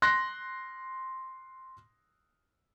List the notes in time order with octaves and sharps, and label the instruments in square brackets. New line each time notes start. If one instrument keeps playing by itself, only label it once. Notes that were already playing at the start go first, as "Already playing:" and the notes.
[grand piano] C6 F#6 A#6